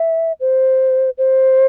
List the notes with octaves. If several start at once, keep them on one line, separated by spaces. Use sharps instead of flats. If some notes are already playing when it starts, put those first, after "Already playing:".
Already playing: E5
C5
C5